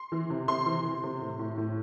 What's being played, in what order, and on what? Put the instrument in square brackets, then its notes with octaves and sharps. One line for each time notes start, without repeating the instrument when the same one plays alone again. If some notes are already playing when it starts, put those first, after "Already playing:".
Already playing: [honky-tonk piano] C6
E3
C3
C3 C6
E3
C3
C3
A2
A2
A2